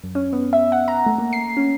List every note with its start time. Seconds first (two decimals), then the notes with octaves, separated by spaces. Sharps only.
0.04 F#2
0.15 C#4
0.33 B3
0.53 E5
0.72 F#5
0.88 A#5
1.06 A3
1.18 A#3
1.33 C7
1.57 C#4